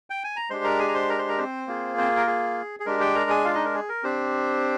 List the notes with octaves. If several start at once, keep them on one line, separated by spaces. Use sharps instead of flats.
G5
G#5
A#5
G#3 D4 G4 C5 C6
A#4 A#5
G#4 G#5
A#5
C5 C6
A#4 A#5
C5 C6
A#4 A#5
C4 C5
A#3 F4 G#4
C4 C5
A#4
G#4
G#4
G#3 D4 G4 A#4
G4 G5
A#4 A#5
G#4 G#5
F4 F5
D#4 D#5
A#4
G#4
A#4
C4 D4 G4 C5